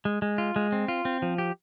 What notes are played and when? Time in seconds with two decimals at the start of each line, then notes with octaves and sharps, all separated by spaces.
0.05 G#3
0.22 G#3
0.38 F4
0.56 G#3
0.72 C4
0.88 F4
1.05 C4
1.22 F3
1.38 G4